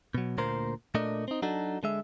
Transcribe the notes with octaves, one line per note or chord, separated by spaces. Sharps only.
B2 F#3
D2 A#2 A#3 A#4 C5
A#2 A3 A#3 D4 D#5
C4 D#4
F#3 D4 D#4 F#4 A4
D3 G#3 E5